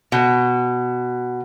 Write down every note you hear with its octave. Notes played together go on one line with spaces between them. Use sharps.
B2